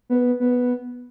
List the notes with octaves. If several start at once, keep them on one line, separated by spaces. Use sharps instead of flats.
B3
B3